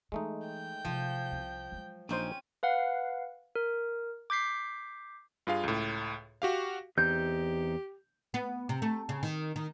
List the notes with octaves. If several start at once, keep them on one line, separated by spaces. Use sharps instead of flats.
E3 G#3 A3 D#4
G5 G6
C3 F3
C2
F#3 G#3
A#1 C4 C#4 D#4 C5 G5 D#7
B4 F5 F#5
A#4
D6 G6 B6 C7
G2 F4 G#4 F5
C#2 A2
F#4 G4 F5
E2 C4 D#4 G4 G6
B3
C3
A3
C#3
D#3
D#3